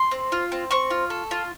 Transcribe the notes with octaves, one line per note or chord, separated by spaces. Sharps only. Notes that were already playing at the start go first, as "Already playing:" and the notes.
Already playing: C6
C4
F4
C4
C4 C#6
F4
A4
F4